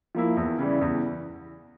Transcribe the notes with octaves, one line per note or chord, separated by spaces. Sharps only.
F3 A#3 E4
E2
C#3 E3 G3
E2